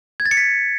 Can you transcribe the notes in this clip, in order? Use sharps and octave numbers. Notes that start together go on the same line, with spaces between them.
G#6
A6
C#7
B6